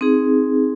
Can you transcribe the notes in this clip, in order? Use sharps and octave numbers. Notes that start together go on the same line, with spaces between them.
C4 D#4 G#4